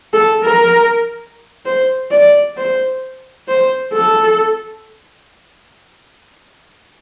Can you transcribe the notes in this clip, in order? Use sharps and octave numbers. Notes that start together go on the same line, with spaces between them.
A4
A#4
C5
D5
C5
C5
A4